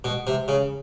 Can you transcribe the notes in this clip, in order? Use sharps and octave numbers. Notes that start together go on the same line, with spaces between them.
B2
C3
C#3